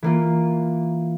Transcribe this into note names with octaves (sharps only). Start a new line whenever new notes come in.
E3 A#3 F4